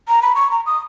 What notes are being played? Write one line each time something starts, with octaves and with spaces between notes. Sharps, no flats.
A#5
B5
C#6
A#5
D#6